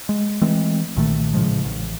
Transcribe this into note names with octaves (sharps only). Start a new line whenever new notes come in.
G#3
E3 G#3 A3 C4
B1 A#2 D#3 A3
A2 C#3 F3 G#3
A1